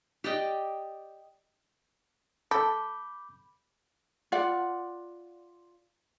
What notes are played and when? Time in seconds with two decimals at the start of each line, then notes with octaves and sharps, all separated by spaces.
0.24 G4 D5 D#5 G5
2.51 A4 B5 D6 G6
4.32 F4 D5 F#5